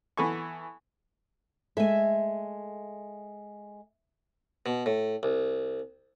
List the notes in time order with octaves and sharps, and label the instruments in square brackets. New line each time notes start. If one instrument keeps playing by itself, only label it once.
[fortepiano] E3 B3 A4 G#5 C#6
[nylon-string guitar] G#3 A3 [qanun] E5 G#5
[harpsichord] B2
A2
C2